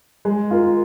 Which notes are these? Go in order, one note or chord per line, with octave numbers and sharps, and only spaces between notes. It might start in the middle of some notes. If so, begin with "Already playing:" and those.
G#3
F4 A#4